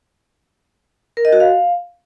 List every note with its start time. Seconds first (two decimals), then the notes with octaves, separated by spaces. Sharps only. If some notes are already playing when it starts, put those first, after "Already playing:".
1.17 A#4
1.25 D#5
1.33 F#4
1.40 F5